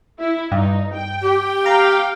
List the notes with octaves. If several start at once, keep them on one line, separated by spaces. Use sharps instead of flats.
E4
G2 D#4
G5
G4
F5 G5 A#5